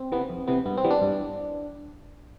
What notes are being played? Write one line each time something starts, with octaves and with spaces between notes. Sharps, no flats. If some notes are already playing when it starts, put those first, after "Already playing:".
Already playing: C4
C3 E3 B3
F2
C3 E3 B3
G2 B3
C4
E3 G3 B3
D4
G2